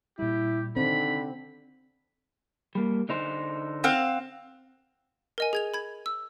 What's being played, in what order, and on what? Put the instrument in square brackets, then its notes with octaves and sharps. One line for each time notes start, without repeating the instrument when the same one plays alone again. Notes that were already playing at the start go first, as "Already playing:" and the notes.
[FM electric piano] A#2 G3 [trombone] E4 [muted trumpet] G4
[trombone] D3 [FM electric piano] D#3 D#4 C5 [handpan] C4 [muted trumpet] B5
[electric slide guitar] G3 A#3
D3 D#4 C5
[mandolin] C4 F5 F#5
[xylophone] A#4 D#5 G#5
G#4 G#6 F7
B5 G#6
E6